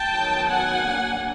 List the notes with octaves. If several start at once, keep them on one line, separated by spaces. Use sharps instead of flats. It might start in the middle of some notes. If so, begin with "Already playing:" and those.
Already playing: G5 A5
D#3 F#3 B3
F#5 G#5
F#3 A#3 D4